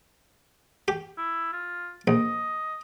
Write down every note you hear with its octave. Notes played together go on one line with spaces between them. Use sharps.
G4
E4
F4
A#1 D#5